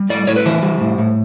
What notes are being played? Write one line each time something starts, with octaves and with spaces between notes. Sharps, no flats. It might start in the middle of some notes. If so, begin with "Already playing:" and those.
Already playing: G3
A2 D5
A2 C#5
B4
E3 C5
G3
A2
A2